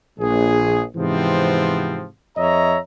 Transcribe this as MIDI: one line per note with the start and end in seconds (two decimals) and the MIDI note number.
0.19 0.83 34
0.19 0.83 68
0.96 2.05 44
0.96 2.05 48
0.96 2.05 52
0.96 2.05 53
0.96 2.05 59
0.96 2.05 60
2.37 2.79 41
2.37 2.79 73
2.37 2.79 75
2.37 2.79 76
2.37 2.79 82